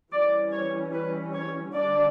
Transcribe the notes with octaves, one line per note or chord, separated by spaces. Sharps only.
E3 G3 C#4 D5
C#5
B4
C#5
D3 G3 D4 D5